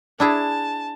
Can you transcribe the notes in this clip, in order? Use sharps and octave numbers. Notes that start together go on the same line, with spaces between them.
D4 E4 G#4 A5